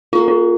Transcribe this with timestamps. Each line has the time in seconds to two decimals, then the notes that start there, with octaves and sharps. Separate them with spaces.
0.13 A#3 C#4 F4 F#4
0.28 F4